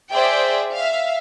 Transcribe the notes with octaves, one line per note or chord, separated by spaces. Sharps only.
G#4 C5 D5 E5 G5
E5 F5